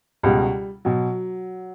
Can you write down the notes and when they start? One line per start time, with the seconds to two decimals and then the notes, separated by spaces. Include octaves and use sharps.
0.23 C#2 B2 G3
0.85 B2 F#3